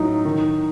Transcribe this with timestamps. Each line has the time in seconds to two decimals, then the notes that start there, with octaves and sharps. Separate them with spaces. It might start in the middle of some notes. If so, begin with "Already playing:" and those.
Already playing: A2 F#3 D#4
0.25 D#3